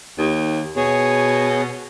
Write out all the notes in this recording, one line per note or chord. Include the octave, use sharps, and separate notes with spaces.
D#2
B2 G#4 C#5